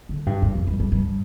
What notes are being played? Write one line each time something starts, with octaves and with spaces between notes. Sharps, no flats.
D3
G2
F2
F2
G2
G2
G2